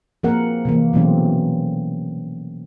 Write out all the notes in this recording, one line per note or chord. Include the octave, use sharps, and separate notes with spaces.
F3 A#3 C4 A#4 F#5
C3 E3 A#3
B2 E3 F#3 A3 C4 C#4